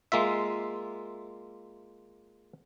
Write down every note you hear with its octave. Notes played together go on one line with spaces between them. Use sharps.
G#3 A#3 F4 E5